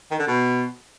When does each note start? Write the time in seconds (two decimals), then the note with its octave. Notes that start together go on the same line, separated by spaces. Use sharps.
0.11 D#3
0.19 D3
0.27 B2